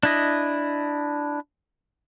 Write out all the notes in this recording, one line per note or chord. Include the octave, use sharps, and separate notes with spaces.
D4 E4 D#5